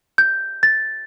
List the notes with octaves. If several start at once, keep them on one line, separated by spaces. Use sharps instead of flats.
G6
A6